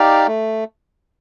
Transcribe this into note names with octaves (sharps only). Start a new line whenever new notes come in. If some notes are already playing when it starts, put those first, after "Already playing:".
Already playing: D#4 G4 D5 F5
A3